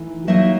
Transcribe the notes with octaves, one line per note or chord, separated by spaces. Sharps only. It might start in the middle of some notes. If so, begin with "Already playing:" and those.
Already playing: E3 A3 D#4
F#3 A#3 D#4 E5